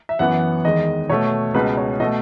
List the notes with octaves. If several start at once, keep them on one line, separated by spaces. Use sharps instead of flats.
E5
F#2 E3 B3 F#5
E2 D#3 G#3 D#5
B2 A3 C#5
C#2 B2 G#3 B4
C#5
B2 A3 D#5